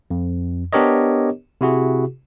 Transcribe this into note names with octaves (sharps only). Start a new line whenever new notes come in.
F2
B3 D4 G4 A#4 C#5 D#5
C3 E4 F#4 G#4